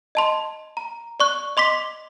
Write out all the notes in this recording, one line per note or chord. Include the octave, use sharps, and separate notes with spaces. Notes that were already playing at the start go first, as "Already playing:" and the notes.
D#5 A5 C6
A#5
D5 C#6 F#6
D#5 C6 D6 B6